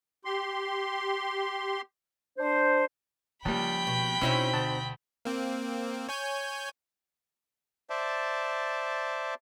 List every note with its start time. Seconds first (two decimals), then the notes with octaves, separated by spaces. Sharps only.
0.25 G4 C6
2.38 D4 C5
3.45 C#2 F3 G3 A#3 G5 B5
3.87 B2
4.21 B2 C4 C#4 D#4 E4 F#4
4.53 D2 A5
5.25 A#3 C4
6.09 C#5 G#5 G6
7.90 C5 D5 E5 A5